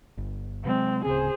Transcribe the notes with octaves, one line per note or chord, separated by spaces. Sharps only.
G1
C3 F#3 G#3 C4
D1 C#3 C4 G#4 C5